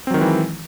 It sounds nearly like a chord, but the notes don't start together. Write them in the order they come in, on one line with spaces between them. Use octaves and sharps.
C4 F#3 D#3 G#3 E3